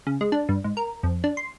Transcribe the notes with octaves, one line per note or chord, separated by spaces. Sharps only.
C#3
G#3
D4
G2
G#2
A#4
F2
D4
C6